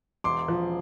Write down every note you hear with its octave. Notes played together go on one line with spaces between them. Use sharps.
E1 C6 D6
F3